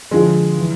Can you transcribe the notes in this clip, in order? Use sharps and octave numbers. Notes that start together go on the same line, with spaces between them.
F2 D3 F3 G#3
E3